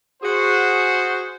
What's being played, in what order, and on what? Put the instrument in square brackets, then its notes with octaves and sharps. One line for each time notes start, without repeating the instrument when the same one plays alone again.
[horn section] F#4 G#4 C5